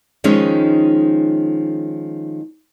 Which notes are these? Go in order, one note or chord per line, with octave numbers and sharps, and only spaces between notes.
D#3 F3 G#3 C#4 D#4